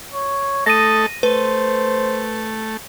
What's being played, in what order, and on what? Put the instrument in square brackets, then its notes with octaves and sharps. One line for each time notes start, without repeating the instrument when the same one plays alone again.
[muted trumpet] C#5
[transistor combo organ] A3 A4 [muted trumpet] D#5 [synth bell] A#6 D#7
[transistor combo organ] A3 [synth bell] B4 [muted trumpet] C5